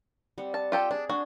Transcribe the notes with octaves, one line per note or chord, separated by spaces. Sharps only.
G3 C4 F#5
A5
F4 G4 A4
D4 G#4
D4 F#4